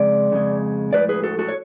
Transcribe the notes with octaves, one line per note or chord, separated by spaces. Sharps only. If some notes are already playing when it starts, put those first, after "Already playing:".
Already playing: F2 C#3 G#3 D5
F2 C#3 G#3
A2 F3 G#3 B4 D5
G#4 B4
F#4 A4
F#4 A4
C#5